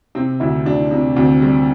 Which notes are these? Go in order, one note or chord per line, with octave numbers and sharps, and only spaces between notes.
C3 C4
D2 E4
D2 D4
C3
D2 C4
G3 C4